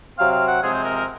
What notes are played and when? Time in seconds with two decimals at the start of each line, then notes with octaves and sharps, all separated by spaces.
0.18 C3 F#3 C4 F5
0.32 F5
0.47 F#5
0.62 C3 F3 G#3 C4 G#4
0.73 C5
0.84 A#4
0.94 A#4